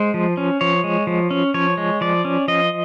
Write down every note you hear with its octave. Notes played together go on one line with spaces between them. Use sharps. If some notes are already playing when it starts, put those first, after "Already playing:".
Already playing: G#3 C5
F3
C#4
F3 C#5
G#3
F3
C#4
F3 C#5
G#3
F3 D5
C#4
F3 D#5